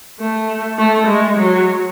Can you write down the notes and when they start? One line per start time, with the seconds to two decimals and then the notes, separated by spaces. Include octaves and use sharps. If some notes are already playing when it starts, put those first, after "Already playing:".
0.20 A3
0.78 A3
1.07 G#3
1.37 F#3